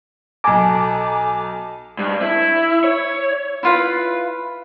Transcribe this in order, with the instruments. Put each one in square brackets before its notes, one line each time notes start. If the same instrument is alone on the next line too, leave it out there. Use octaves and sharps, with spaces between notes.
[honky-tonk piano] B1 A4 [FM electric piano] G#5 A#5 D6
[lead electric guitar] G2
E4
C#5
[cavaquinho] E4 F4 B4